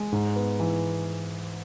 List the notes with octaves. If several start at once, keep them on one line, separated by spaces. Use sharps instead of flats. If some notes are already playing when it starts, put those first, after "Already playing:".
Already playing: G#3
G#2
B3
E3